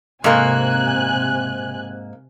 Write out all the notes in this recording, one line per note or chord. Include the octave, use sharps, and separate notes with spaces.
G#2 C3 A#3 G#5 F#6